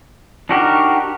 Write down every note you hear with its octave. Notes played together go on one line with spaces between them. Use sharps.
D4 D#4 F#4 G4 A#4